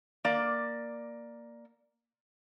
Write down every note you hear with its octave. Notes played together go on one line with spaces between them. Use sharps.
A#3 D5